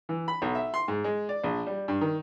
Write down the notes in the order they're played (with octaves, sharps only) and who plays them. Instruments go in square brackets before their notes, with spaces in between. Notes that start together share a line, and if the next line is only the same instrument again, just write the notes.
[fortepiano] E3
B5
B1
E5
C6
G#2
G#3
D5
A#1
G3
G2
D#3